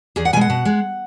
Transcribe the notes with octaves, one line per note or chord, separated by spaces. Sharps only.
E2 G#4
F#5
B2 G#3 F#5 G#5
B2
G#3